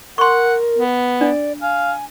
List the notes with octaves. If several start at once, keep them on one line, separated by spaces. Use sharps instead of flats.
A#4 F#5 C6 C#6
B3
D4 D5
F5 G#5